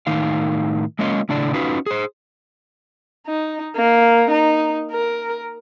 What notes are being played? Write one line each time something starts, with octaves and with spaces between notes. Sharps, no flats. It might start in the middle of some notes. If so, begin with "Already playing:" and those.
A2 D#3 D#4 F5
G#3 A#3 C#4 F4 D#5
A2 C#3 D4 E4 D5
C#4 D#4 F4 F#4 B4
G#4 C5
D#4
A#3
D#4
A#4